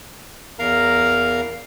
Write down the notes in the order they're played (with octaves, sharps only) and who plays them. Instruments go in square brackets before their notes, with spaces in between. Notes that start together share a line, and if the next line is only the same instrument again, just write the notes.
[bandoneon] E2 A#4 F5 A#5